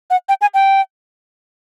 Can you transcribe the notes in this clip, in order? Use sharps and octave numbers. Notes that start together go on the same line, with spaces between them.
F#5
G5
G#5
G5